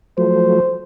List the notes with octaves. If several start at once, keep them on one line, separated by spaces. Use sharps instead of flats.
F3 F#3 A3 C5